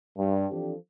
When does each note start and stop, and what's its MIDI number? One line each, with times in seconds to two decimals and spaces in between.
0.17 0.45 43
0.51 0.74 52
0.51 0.74 53
0.51 0.74 60
0.51 0.74 62
0.51 0.74 67
0.51 0.74 69